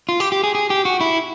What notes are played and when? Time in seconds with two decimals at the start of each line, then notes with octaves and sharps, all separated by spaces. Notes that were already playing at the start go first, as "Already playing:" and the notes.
0.09 F4
0.20 G4
0.32 G4
0.44 G#4
0.55 G#4
0.70 G4
0.85 F#4
1.01 E4